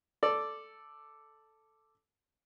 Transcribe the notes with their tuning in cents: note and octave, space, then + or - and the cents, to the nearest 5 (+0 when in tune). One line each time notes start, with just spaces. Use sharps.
A4 +0 D5 +0